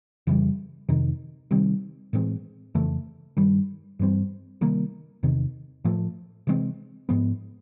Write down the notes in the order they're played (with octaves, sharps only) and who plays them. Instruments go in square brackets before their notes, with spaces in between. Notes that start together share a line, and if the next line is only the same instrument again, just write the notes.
[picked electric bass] F2 C#3 E3 G3
F2 C3 D#3
C3 D#3 G3 C4
A2 E3 G#3 C4
F2 C#3 E3 A3
G2 D#3 G3
G2 E3 G3 C4
C3 D#3 G3 A#3
E2 C3 D#3
A2 F3 A3
C3 E3 G#3 C4
G#2 F3 G#3 B3